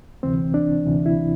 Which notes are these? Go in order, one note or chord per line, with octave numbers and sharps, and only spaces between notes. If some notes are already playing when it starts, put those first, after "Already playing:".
D2 C3 E3 C4
D4
D2 C3 E3
E4